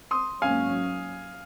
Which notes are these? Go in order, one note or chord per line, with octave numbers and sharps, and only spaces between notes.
C6 D#6
G#2 F#3 A#3 C#4 F5 G#5